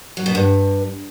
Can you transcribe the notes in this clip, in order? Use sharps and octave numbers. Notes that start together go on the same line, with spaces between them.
F#3
B2
G2